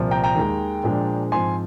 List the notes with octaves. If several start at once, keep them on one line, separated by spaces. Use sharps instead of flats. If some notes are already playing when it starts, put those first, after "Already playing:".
Already playing: C2 A#2 F3
G5 A#5
G5 A#5
D#2 D#3 G#3
A#2 F3 G#3 D4
G#2 F3 C4 G#5 C6